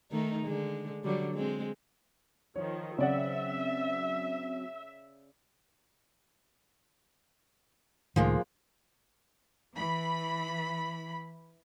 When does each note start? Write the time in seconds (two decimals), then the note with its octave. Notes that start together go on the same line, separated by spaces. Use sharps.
0.11 D#3 A3 D#4
0.45 D3 G#3
1.04 D3 F#3 G3
1.35 G#3 C4
2.56 D#3 F3 C#5
2.98 C#3 F#3 C4 C#4 D5 E5 F#5
8.16 C#2 A2 D#3 F3 G#3 A#3
9.76 E3 B5